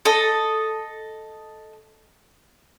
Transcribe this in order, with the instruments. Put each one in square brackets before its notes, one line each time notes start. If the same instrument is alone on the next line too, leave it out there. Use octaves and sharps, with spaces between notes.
[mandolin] A4 D#5